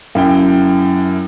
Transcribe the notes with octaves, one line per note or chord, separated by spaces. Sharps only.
F#2 E4 G5